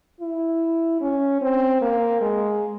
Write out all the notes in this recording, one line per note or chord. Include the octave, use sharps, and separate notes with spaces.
E4
C#4
C4
A#3
G#3